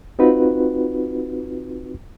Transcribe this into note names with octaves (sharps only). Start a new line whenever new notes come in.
C4 D#4 F4 F#4 B4